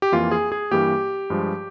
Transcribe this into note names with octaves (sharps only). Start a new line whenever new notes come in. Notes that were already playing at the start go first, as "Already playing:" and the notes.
G4
F2 E3 A#3 F4
G#4
G#4
G2 E3 A#3 G4
G2 F3 G#3